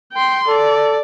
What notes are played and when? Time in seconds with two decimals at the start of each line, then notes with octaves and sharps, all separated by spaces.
0.12 G5 C6
0.48 A4 D5